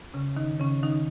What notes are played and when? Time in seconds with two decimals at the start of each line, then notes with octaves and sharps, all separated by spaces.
0.13 C#3 C#4
0.36 D#3 D#4
0.60 C#3 C#4
0.83 D#3 D#4